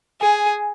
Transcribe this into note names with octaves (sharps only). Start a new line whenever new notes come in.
G#4 G#5